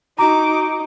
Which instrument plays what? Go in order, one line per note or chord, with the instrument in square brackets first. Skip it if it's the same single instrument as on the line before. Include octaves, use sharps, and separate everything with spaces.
[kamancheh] D#4 [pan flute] F#4 [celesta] A#5 [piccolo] D6